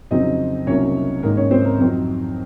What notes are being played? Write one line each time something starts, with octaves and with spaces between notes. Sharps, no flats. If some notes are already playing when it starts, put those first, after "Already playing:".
F2 C#3 F#3 C4 D#4 D#5
C2 C3 F#3 A#3 C#4 D#4 C#5
G#2 D#3 A#3 D#4 A#4
C#4 C#5
C4 C5
A#4
F2 D#3 F#3 C4 D#4 A#4